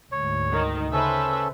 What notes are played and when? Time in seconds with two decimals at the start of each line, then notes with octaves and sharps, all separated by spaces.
0.12 D2 G#2 C#5
0.51 D#3 D#4
0.93 C#3 C#4 A4 B4 C5 E5